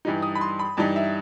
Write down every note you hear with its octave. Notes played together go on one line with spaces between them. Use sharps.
G2 E3 G3 D#4
D#6
B5
C6
B5
G2 E3 G3 D#4 A5
E5